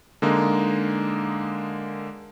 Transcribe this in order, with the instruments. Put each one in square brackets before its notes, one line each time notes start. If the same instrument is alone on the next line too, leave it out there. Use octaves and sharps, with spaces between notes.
[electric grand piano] D3 G#3 A#3 D#4